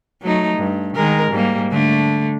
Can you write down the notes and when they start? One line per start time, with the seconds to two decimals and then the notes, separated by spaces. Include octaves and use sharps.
0.22 F#3 A3 D#4
0.59 G2
0.95 D#3 G#3 A#4
1.32 G#2 G3 A#3
1.72 D3 A3